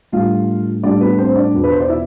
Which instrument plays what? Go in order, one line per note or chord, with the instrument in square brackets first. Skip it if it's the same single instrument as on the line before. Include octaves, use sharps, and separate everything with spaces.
[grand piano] A2 G3 D4 F4 F5
A2 G3 D4 D5
B3 B4
C4 C5
D4 D5
E2 B2 B3
B4
C5
D5
E4 E5